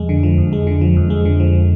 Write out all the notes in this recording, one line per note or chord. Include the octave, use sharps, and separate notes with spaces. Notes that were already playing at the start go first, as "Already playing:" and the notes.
Already playing: F2 G#3
D3
F3
F2
G#3
D3
F3
F2
G#3
D3
F3